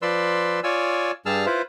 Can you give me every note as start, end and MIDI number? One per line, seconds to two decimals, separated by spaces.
0.02 0.60 53
0.02 0.60 71
0.02 0.60 74
0.02 0.60 84
0.02 0.60 88
0.64 1.11 65
0.64 1.11 73
0.64 1.11 74
0.64 1.11 80
0.64 1.11 88
1.26 1.46 43
1.26 1.46 55
1.26 1.46 68
1.26 1.46 81
1.26 1.46 88
1.26 1.46 89
1.46 1.62 64
1.46 1.62 65
1.46 1.62 71
1.46 1.62 72